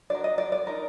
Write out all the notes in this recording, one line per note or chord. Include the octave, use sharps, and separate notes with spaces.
D4 F#4 A#4 D5
D#5
D5
D5
D#4 A#4